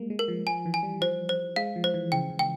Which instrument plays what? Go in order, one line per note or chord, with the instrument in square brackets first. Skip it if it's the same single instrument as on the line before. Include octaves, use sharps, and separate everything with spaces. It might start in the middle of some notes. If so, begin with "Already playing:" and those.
Already playing: [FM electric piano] G3 G#3 A#3
G#3
[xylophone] A#4
[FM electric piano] F3
[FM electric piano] F3 [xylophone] G#5
[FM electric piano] E3
[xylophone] G#5
[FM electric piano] G3
[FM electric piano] F3 [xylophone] C5
[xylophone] C5
[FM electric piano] G#3 [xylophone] F5
[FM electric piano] F3
[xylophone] C5
[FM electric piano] E3
[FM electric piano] C#3 [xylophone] G5
[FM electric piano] C#3
[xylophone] G5